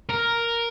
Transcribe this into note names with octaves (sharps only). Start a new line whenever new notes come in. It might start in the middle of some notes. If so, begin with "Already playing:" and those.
A#4